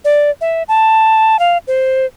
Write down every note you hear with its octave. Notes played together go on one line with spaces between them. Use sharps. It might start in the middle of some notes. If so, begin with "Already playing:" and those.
D5
E5
A5
F5
C5